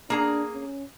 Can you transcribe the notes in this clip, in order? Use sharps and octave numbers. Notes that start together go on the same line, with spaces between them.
A#3 D4 G#4 A#5
C#4